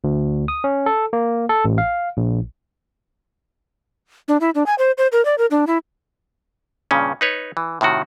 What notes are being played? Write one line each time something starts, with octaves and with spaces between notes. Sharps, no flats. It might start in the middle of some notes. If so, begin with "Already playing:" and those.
D2
D#6
C#4
A4
A#3
A4
A1
F5
A#1
D4
E4
D4
G#5
C5
C5
A#4
D5
A#4
D4
E4
G2 A#2 C#3 C#4
D#4 B4 C#5
E3
A2 C3 D#3 F#4